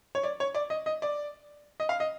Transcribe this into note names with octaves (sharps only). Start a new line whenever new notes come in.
C#5
D5
C#5
D5
D#5
D#5
D5
D#5
F5
D#5